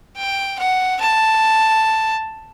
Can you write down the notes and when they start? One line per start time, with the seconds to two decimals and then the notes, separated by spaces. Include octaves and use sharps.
0.17 G5
0.59 F#5
1.01 A5